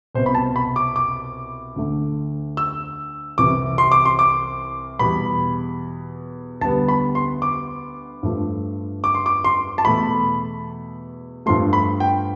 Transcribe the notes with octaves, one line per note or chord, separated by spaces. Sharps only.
C2 B2 B3 C5
B5
A5
B5
D6
D6
D2 D3 A3
E6
C2 C3 E3 D6
C6
D6
C6
D6
E2 B2 G3 B5
D2 D3 G3 B3 A5
B5
C6
D6
G2 F3 A3
D6
C6
D6
C6
A5
E2 B2 A3 B5
G2 F3 A3 C6
B5
G5